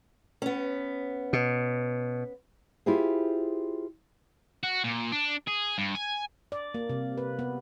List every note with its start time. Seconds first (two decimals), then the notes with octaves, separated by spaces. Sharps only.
0.42 B3 C#4
1.33 B2
2.86 E4 F4 G4 G#4 C5
4.63 F#4
4.84 A#2
5.12 D4
5.47 G#4
5.78 G2
5.95 G#5
6.52 D5
6.74 A#3
6.89 C3
7.18 B4
7.39 B3